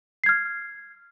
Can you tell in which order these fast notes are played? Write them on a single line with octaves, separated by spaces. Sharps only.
C7 G#6 F6